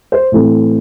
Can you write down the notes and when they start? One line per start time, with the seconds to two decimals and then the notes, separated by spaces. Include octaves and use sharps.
0.12 C5
0.32 A2 E3 A3 C4